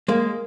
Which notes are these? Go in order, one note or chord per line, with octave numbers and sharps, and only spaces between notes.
G#3 A#3